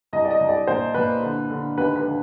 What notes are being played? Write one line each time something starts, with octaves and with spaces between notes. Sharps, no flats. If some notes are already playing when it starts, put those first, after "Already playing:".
C2 D#5
D5
D#5
C2
D5
A#2 C5
A#2 B4
D3
D3
D#2 B4
B4
D3